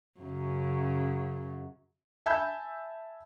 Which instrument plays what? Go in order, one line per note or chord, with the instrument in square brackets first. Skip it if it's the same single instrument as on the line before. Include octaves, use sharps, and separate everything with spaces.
[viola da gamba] F#2 C#3
[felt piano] E5 G#5 A5 B5 E6 G6